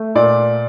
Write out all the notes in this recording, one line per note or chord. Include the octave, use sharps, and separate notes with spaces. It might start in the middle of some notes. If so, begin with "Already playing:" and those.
Already playing: A3
A#2 D5